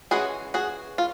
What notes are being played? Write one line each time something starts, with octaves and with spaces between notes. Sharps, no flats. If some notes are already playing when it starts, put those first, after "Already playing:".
E3 G#3 C#4 F#4 G#4
F#4 G#4
F4